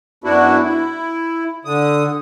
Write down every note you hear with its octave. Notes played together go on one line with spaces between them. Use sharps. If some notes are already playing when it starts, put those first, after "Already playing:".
F#2 B3 D4 E4 F#4
E4
D3 D#6